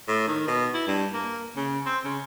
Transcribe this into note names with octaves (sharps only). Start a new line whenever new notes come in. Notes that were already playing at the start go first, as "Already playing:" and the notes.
A2
D#3
B2
E4
G2
A#3
C#3
C4
C#3